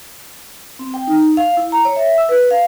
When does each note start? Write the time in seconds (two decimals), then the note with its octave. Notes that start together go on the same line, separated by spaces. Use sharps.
0.79 C4
0.94 G5
1.07 D#4
1.37 F5
1.57 E4
1.72 A#5
1.85 C#5
1.96 E5
2.18 E6
2.29 B4
2.51 F5